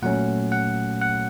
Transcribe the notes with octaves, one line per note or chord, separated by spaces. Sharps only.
A#2 F#3 A3 C#4 F#5
F#5
F#5